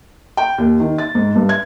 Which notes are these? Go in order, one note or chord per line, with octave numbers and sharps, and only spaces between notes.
G5
D#2
D#3
A6
G#2
G2
G#6